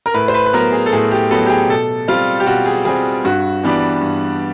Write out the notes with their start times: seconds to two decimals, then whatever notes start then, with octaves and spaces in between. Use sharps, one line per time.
0.06 A#4
0.14 A2 B4
0.28 C5
0.34 B4
0.46 B4
0.53 F#3 B3 A#4
0.72 G#4
0.86 A4
0.92 A2 G#4
1.11 G4
1.31 F#3 B3 A4
1.46 G4
1.50 G#4
1.69 B2 A4
2.08 G3 C4 F4
2.40 G4
2.46 B2 F#4
2.66 G#4
2.85 G3 C4 G#4
3.24 G2 F#4
3.64 E3 G3 B3 D4
4.01 G2